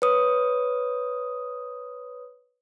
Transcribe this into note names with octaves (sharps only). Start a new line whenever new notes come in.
B4 C#5 D#6